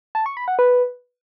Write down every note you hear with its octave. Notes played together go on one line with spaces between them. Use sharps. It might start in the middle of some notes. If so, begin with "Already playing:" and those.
A5
C#6
B5
F#5
B4